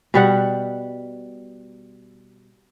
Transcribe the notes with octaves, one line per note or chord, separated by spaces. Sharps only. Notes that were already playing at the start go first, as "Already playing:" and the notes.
B2 G3 F#5